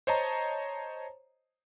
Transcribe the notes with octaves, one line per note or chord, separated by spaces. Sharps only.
C5 C#5 D#5 A5 A#5